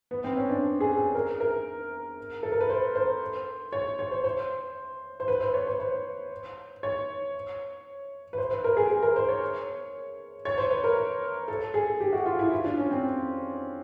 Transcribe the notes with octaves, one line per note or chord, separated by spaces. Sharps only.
B3
C4
C#4
D4
G#4
G#4
A#4
A#4
A4
A#4
B4
C5
C5
C#5
C#5
C5
C5
C5
B4
C5
C#5
C5
C5
C#5
B4
C5
B4
A#4
G#4
G#4
A#4
C5
C#5
C#5
C5
B4
A#4
A4
G#4
G4
F#4
F4
E4
F4
D4
C#4
C4